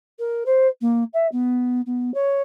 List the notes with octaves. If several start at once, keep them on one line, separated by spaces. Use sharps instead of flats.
A#4
C5
A#3
E5
B3
B3
C#5